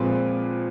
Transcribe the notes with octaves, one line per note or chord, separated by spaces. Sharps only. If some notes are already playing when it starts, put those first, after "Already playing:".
Already playing: A#2 F3 G#3 C4 B4